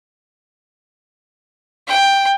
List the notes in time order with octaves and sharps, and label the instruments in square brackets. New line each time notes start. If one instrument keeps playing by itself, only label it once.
[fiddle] G5